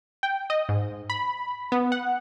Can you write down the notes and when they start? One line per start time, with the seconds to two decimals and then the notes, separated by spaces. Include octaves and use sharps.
0.23 G5
0.50 D#5
0.69 G#2
1.10 B5
1.72 B3
1.92 F#5